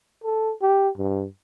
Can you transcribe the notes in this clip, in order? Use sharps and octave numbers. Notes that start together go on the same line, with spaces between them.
A4
G4
G2